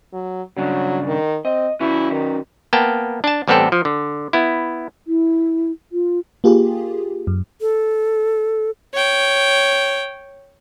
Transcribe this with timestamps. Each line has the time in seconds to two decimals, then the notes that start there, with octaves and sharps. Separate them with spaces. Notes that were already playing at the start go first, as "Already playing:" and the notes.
0.13 F#3
0.57 G2 C#3 F#3 D4
1.07 D#3
1.45 C4 D#5
1.81 C#4 E4 F#4 B4
2.11 D#3
2.73 A#3 B3 G5 A5
3.24 D4 A5
3.48 A1 G3 B3 C4 A4 G5
3.72 F3
3.85 D3
4.33 B3 E4
5.07 E4
5.92 F4
6.44 A#3 F4 G4 G#4
7.27 F#2
7.61 A4
8.94 C#5 G5